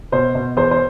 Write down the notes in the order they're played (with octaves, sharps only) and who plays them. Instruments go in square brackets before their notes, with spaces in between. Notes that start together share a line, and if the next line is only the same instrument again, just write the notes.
[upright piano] B2 C5
B2
E2 C5
C5